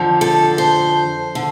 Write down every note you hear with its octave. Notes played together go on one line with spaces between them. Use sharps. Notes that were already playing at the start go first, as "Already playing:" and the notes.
Already playing: F2 D3 F3
A4
C5
D3